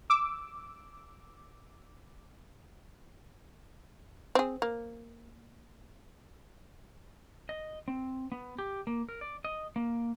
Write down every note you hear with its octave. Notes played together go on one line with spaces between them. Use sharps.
D6 E6
C4 G#4
A#3
D#5
C4
B3
G4
A#3
A#4
D5
D#5
A#3